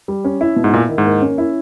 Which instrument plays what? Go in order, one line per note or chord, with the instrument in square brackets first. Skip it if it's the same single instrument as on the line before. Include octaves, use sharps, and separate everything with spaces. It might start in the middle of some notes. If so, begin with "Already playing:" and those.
[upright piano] G3
C#4
E4
B2
[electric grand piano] G#2
[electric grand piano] A#2 [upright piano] E4
[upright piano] D#3
[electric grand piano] G#2
[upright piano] A#3
C#4
E4